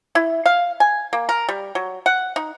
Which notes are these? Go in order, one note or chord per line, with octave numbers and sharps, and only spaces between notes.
E4
F5
G#5
A#3
A#4
G3
F#3
F#5
D#4